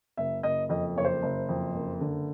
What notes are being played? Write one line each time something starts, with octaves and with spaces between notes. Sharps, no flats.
F#1 E5
F#1 D#5
F2 D#5
F#1 C#5
C5
F#1
F2
F#1
D3